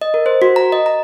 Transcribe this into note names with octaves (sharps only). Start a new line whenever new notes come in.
D#5
A#4
C5
F#4
A#5
D#5
A#5